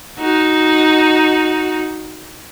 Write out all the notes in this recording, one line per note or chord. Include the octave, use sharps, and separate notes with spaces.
D#4 F#4